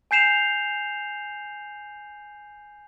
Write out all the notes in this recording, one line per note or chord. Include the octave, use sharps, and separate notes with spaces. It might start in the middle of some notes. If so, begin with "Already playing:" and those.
G#5 G6 C7 E7 F7